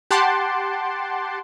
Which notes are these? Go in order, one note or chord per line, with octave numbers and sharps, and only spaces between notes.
G4 F#5 A5 C6 D6